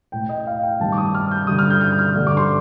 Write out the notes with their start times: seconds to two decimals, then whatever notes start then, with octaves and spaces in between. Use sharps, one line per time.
0.12 A2 G5
0.29 D#5
0.47 F5
0.63 G5
0.80 G2 D#3 A5
0.92 D6
0.98 D#6
1.15 F6
1.31 G6
1.47 G2 D3 D#6
1.59 F6
1.70 G6
1.81 G6
1.99 F6
2.16 G2 D3
2.27 D6
2.37 C6